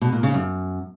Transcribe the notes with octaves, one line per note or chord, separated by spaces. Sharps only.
B2
A#2
C#3
F#2